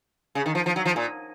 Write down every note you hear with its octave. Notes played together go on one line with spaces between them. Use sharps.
C#3
D#3
F3
F3
F#3
F3
A#2